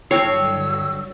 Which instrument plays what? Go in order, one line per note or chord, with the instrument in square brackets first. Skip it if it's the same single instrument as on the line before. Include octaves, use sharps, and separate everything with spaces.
[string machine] G2 D3 F#3 [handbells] E4 G5 C7 [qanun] C#5 [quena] E6